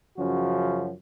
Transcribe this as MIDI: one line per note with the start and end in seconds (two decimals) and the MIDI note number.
0.18 0.91 42
0.18 0.91 49
0.18 0.91 53
0.18 0.91 61
0.18 0.91 66